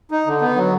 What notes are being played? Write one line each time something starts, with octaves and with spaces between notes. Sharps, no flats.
D#4
D3
B3
F#3